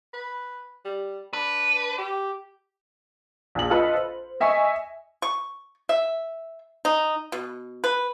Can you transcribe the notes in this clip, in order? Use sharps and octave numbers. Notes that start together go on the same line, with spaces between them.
B4
G3
D4 B4
G4
A#1 G#4 F#7
F4 A4 B4 D#5 B5
C5
D#5 E5 G#5 C#6
C#6
E5
D#4
B2
B4